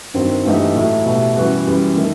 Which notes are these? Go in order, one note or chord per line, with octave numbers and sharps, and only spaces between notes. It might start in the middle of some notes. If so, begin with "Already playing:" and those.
G2 D#3 F#3 C4
G2 E3 A3 D#4 G4
A2 F#3 A3 E4
B2 A3 E4 G4
F#2 E3 G3 B3 F#4
F#2 E3 G3
D#3 A3